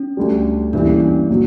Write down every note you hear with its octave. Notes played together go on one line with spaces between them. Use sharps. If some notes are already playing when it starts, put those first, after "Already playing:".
Already playing: C#4
D2 D3 G3
G2 E3 G3 A#3 D4
C#4
D4
A#2 F#3